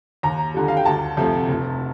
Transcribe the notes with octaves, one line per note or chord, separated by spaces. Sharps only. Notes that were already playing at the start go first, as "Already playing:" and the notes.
D#2 A#5
D3 G3
F5
G5
D2 A5
C3 F3 A3
F1